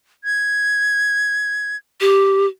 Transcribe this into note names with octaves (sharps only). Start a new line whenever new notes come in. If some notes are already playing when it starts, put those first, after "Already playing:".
G#6
G4